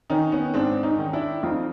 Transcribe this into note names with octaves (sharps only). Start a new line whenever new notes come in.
D#3 C#4 D#4
B3 C#4
G#2 C4 D4
C#4 D#4
D#3
D4 E4
F2 D#4 F4